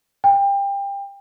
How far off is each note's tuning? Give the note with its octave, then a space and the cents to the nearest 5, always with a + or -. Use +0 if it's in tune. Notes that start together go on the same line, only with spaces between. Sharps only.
G5 +25